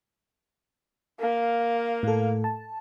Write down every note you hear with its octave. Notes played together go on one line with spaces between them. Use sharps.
A#3 F5
A2 A4
A5